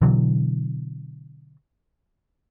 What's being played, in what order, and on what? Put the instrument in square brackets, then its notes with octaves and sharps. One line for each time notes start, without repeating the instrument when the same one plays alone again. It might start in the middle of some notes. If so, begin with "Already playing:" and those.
[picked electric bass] B2 D3 E3 F#3